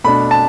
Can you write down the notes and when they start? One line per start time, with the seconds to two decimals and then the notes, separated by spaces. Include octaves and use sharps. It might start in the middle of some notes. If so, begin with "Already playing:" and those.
0.04 B2 A3 D4 B5
0.31 A5